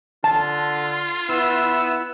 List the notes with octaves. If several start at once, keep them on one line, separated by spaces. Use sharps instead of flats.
D3 F4 A5
B3 E4 E6